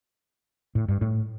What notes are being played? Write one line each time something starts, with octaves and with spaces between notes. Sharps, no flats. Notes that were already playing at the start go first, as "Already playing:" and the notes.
A2
G2
A2